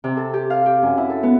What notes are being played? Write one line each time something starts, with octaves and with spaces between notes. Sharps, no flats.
C3
A4
G4
F5
G4
F#2
E4
A4
B3